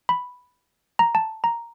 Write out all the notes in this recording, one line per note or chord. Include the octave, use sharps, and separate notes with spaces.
B5
A#5
A5
A#5